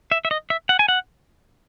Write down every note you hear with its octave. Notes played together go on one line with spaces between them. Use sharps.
E5
E5
D#5
E5
F#5
G#5
F#5